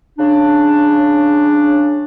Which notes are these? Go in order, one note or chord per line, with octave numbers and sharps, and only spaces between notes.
C#3 D4